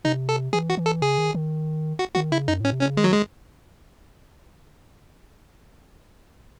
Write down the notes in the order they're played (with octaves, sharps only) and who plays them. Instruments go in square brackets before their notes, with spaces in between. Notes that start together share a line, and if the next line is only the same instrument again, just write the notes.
[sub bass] C3 [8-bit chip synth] D#4
[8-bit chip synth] A4
[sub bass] E3 [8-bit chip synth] G#4
[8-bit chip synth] F#4
[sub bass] E3
[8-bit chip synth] A4
[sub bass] C#3 [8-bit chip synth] G#4
[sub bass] D#3
D#3
[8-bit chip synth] F#4
[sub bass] D#3 [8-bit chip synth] F#4
[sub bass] C#3 [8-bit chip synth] E4
[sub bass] F#2 [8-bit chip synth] D#4
[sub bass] A2 [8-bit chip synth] C#4
[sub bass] C3
[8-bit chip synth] C#4
[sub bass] C#3
[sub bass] D#3 [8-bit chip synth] G#3
[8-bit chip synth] F#3
G#3